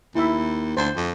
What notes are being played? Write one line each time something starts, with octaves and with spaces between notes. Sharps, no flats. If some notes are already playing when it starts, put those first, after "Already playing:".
D#2 E4 E5
D2 C5
F2